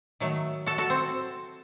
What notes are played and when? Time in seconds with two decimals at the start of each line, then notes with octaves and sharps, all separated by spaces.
0.20 D#3 F#3 A3
0.66 F#4 A4
0.78 F#4 A4
0.90 C4